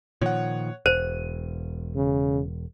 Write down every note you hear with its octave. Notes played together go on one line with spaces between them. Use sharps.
A#2 D#3 F3 C#5 F#5
E1 C5 D#7
C#3